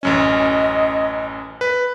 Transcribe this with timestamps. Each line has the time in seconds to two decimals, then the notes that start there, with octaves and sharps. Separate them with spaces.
0.03 A1 F#2 C#4 D#5
1.61 B4